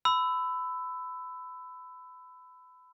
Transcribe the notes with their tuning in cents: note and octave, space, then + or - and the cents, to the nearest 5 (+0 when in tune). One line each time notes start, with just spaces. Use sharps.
B5 +25 E6 +0